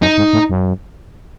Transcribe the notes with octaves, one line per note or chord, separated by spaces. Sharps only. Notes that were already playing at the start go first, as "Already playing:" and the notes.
F#2 D#4
G#2
A2
F#2